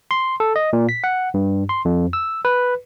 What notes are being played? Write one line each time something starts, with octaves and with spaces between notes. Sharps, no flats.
C6
A4
D#5
A#2
B6
F#5
G2
C6
F2
E6
B4